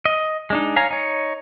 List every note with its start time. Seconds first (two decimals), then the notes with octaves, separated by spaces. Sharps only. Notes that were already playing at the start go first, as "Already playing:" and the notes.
0.05 D#5
0.50 G#3 D4 D#4
0.76 C#5 F5 G#5 A#5
0.91 D#4 C#5